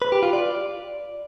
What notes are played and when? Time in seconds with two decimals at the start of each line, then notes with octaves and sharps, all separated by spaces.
0.02 B4
0.12 G4
0.23 F4
0.33 D5